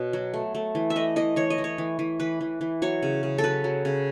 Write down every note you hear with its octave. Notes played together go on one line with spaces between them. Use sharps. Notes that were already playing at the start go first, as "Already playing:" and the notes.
Already playing: B2 C#5
F#3
A3
A3
E3
E5
A3 D#5
E3 D#5
E3 C#5
D#5
E3
C#5
E3
E3
E3 B4
E3
E3
F#3 C#5
C#3
C#3
A4
F#3 B4
F#3
C#3